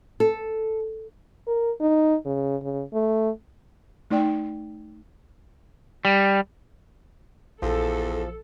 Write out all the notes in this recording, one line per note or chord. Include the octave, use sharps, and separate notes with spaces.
A4
A#4
D#4
C#3
C#3
A3
A3 D#4 D5 G5
G3
A#1 E2 F3 A4